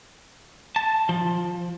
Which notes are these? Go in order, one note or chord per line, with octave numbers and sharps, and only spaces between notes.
A5
F3